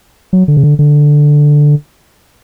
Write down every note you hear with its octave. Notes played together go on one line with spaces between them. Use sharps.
F#3
D3
C#3
D3
D3